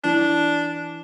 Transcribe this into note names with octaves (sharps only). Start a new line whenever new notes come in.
E3 D4